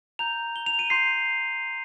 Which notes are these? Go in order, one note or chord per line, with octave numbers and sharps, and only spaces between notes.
A#5 G6 F7
G7
F7
D#7
C6 G6 C7